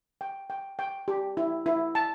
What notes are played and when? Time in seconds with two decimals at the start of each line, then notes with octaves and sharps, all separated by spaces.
0.21 G5
0.50 G5
0.79 G5
1.08 G4
1.37 E4
1.66 E4
1.95 A5